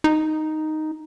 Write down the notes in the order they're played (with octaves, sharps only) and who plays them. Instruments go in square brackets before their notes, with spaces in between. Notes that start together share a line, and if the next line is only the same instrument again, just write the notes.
[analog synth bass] D#4